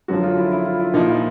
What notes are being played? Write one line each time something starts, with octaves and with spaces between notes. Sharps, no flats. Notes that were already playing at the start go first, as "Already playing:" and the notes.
F#2 D3 F3 F#4
F4
E4
E4
F4
E4
A#2 F3 D#4
E4